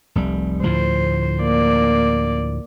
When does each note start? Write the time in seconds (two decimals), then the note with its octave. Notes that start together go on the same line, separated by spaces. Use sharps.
0.15 F1 C2 G3
0.64 D2 A2 F3 C5
1.41 A#3 D5